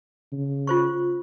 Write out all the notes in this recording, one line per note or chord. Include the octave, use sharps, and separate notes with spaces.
C#3
F4 C5 C#6